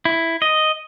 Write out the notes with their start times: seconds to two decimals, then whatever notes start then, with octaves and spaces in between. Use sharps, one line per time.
0.05 E4
0.42 D#5